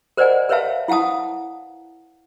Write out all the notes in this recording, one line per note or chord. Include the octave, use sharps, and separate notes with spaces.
A#4 C5 D5 D#5 F#5 G#5
A#4 B4 C#5 E5 F5 A5
E4 F5 F#5 A5 D#6